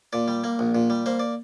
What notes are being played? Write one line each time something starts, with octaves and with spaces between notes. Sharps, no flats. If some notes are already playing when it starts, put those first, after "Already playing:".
A#2 D5
G3
A#3
A#1
A#2
G3
A#3 C5
D5